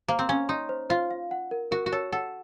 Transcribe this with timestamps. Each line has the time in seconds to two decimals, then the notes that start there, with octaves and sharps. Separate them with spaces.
0.08 A#3 C5
0.19 C4
0.29 C#4 F5
0.49 D#4 C6
0.69 C5
0.89 F4 C5
1.11 F5
1.31 F#5
1.51 A#4
1.71 F#4 A#4
1.86 F#4
1.92 A4 C#5
2.12 A4 F#5